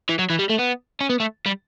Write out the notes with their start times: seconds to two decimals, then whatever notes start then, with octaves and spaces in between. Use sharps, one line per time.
0.09 E3
0.19 F#3
0.30 E3
0.39 G3
0.50 A3
0.59 B3
1.01 C#4
1.10 B3
1.20 A3
1.46 G3